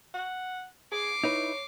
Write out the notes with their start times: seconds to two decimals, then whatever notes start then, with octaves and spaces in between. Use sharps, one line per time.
0.14 F#5
0.92 G#4 D6 C7
1.24 D#4 E4 B4 C#5